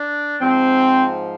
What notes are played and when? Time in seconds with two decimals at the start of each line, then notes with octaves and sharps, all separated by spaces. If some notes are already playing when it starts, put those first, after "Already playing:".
Already playing: D4
0.41 G#2 F3 C4